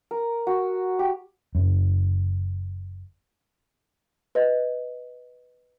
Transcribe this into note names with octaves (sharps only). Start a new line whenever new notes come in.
A#4
F#4
G4
F#1 F#2
B4 D#5